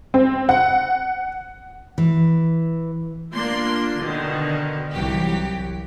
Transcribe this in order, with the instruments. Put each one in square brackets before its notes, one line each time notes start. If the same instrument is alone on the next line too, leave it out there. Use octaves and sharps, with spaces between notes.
[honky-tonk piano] C4
F#5
[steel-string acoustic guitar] E3
[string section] A#3 D4 F4 C6
B2 D3 D#3
C2 E3 F#3 G4 B6